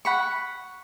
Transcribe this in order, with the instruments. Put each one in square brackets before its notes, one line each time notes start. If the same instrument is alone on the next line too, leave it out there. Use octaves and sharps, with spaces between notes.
[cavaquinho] F#5 B5 C#6